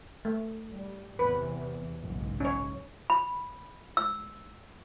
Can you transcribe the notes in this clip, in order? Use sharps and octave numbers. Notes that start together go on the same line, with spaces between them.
A3
G3
E2 C3 E3 B4
F#1 B1 G#2
C#4 C#5
B5
E6